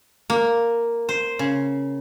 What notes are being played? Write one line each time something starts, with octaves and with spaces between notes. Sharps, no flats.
A#3
C5
C#3